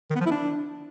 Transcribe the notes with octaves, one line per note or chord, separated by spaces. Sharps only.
D#3
B3
F3
E4
D4